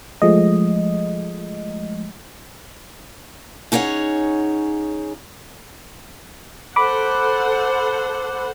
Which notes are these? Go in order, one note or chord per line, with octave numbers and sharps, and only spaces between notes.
F3 G#3 A3 D#5
C#4 D#4 G#4 C#5 F#5
A4 C5 F#5 B5 D6